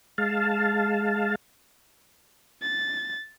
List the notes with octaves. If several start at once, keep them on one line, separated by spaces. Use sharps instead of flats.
G#3 F5 A5
A6